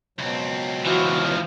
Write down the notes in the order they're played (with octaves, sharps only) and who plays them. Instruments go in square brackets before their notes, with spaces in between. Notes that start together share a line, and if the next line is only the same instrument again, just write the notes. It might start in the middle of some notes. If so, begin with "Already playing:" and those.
[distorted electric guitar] C#2 C4 [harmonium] B2 F#3
[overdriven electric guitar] E3 F3 [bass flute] F#4